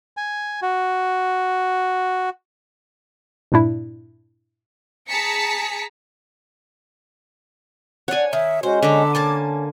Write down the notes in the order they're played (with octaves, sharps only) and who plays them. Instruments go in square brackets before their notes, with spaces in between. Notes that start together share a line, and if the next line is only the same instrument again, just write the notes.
[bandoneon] G#5
F#4
[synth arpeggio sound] G2 A#2 D4 E4
[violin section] G#4 A5 A#5 B6 C#7
[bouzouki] D4 F#5 [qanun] C#5 G#5
[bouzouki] D#3 [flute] E5
[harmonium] G#3 C#4 [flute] F#4 [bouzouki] C5
[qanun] D3 A#5 [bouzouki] B3 A4 [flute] D6
[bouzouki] A#3 G#5 A5 [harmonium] C#4